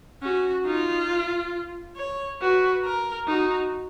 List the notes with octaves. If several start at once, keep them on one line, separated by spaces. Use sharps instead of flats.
C#4 F#4
D#4 F4
C#5
F#4 B4
A#4
D#4 F#4